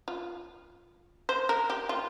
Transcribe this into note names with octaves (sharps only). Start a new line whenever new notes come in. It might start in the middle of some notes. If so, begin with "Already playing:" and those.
F4
C5
A#4
G4
F4